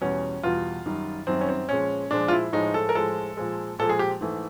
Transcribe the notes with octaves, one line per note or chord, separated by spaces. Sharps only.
E2 B2 G3 C#4
E2 B2 G3 F4
F#2 D#3 G3
F#2 D#3 G3 C4
C#4
C4
A#2 F3 G#3 C#4
A#2 F3 G#3 D4
F4
E4
A2 F3 G#3 D#4
A4
A#4
A2 F3 G#3 A4
A#2 F3 G#3
A#2 F3 G#3 A4
G#4
G4
G#2 E3 A3